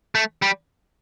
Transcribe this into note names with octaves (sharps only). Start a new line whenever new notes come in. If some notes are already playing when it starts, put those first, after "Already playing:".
A3
G3